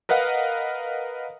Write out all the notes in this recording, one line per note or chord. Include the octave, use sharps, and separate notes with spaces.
A#4 B4 D#5 F5 F#5